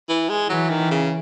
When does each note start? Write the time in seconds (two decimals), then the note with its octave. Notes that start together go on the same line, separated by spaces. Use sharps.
0.09 E3
0.29 G#3
0.49 E3 F#3
0.70 D#3
0.91 C#3